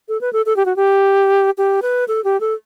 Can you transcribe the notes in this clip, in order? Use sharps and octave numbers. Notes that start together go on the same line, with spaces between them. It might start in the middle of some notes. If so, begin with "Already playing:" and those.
A4
B4
A4
A4
G4
F#4
G4
G4
B4
A4
G4
A4